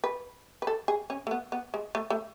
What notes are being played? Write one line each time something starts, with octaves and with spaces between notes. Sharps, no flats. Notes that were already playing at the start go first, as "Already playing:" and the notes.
B4
B4
A4
G#4
C#4
A3
B3
B3
G#3
A3
A3